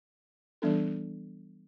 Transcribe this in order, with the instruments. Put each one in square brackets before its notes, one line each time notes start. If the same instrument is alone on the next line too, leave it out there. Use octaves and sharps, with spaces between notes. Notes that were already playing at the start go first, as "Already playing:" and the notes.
[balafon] E3 G3 B3 D4 A4